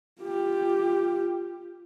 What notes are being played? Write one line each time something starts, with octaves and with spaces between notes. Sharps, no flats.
F4 G4